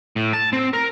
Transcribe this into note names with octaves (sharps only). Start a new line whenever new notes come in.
A2
A5
C4
A#4